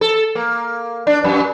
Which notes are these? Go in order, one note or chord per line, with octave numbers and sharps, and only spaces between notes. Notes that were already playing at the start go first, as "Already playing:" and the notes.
A4
A#3
D4
F#2